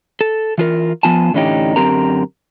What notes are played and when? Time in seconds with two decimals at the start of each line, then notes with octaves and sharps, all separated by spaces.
0.21 A4
0.58 E3 F4 A#4
1.03 F3 B3 F4 G#5 A5
1.33 A2 D3 E3 C#4 D#4 G4
1.76 F#2 D3 C4 G4 A#4 A#5